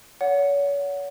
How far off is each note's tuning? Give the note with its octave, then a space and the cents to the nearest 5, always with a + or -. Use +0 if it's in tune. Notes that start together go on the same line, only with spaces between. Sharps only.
C#5 +35 F#5 -10